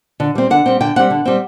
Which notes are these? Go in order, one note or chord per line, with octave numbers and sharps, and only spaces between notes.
D3
G3 C4
D3 F#5
G3 C4
D3 G5
G3 C4 F#5
D3
G3 C4